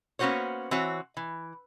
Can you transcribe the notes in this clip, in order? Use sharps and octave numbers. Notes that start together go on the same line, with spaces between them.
A#3 B3 C#4 F#4 C5 C#5
E3 C4 F#4 C#5
E3